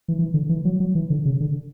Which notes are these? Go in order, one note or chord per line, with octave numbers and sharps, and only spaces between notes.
E3
E3
D3
E3
F#3
F#3
E3
D3
C#3
D3